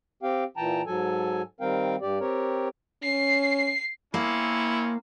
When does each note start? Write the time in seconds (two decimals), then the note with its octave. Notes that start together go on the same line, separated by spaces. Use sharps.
0.23 C4 G4 F5 G5
0.57 A#2 E3 G5 A5 A#5
0.86 G#2 F#3 A4 G#5
1.60 D#3 G3 C4 A#4 F5 G5
2.01 G2 G4 D5
2.20 C4 G4 A#4 C#5
3.03 C#4 C7
4.14 A#3 C4 C#4 E4